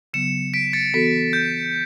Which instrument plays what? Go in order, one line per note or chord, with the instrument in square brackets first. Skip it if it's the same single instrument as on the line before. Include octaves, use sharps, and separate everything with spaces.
[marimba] C#3 F#3 B3 [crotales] C#7 E7
[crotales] B6 D7
A6 C#7
[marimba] E3 B3 F#4 A4 [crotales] B6
[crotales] G6